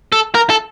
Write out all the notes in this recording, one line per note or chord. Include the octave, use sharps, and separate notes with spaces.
A4
A#4
A4